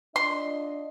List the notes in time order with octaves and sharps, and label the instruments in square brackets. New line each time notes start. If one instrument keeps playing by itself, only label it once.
[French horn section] D4 F4 D#5 [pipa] C6